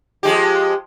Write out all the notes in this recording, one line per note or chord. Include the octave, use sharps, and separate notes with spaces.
F3 G#3 G4